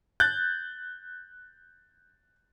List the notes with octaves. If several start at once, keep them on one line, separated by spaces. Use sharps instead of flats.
F#6 G6 A6